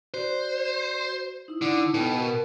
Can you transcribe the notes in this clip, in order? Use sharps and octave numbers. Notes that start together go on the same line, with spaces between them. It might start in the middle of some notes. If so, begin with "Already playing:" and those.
F#4 C5 D5
D#4 E4
D3
B2 A4 G5 B5
F#4 A#4